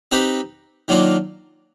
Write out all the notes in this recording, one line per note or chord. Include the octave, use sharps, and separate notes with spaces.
C4 D#4 G4 B4 D#5
D#3 F#3 A#3 D4 F4